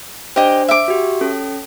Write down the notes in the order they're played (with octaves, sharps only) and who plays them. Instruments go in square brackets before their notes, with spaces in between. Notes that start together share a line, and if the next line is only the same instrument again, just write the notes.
[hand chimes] D4 C5 [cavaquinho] G4 D#5
[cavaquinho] E5 D6
[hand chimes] F#4 G4
C#4 A4